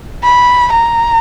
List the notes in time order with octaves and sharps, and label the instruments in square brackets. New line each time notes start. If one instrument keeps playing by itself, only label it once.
[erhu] B5
A#5